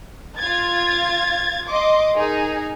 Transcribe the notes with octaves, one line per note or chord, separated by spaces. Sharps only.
F4 G#6 A6
D#5 C6 D6
D#4 G#4 A#4